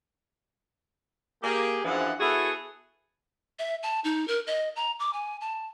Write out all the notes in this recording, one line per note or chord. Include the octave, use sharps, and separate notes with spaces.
A#3 G4 G#4
F#2 E3 F3 D4 G#4 F#5
B3 E4 F#4 G#4 A4
E5
A5
D#4
A#4
D#5
A#5
D6
G#5
A5